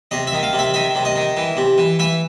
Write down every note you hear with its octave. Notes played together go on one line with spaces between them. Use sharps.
C3 D#5
E5
D#3
F5
C3
E5
D#3 E5
C3
D#5
D#3
E3
C3
E3
E3 E5